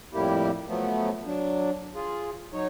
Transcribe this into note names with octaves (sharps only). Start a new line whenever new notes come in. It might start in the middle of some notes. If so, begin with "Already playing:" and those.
F2 A2 G3 A#3 E4 G4
F3 F#3 A3 B3
F#3 D4
F4 G#4
F#3 D#4 C#5